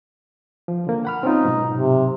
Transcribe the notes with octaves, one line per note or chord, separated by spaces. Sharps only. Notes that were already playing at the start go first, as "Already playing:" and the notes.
F3
D3 A#3
F#5 B5 F6
C4 C#4 D#4 F4
G#2 B2 F#3
C3